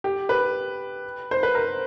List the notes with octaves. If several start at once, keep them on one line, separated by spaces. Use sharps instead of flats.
G4
B4
C5
B4
A#4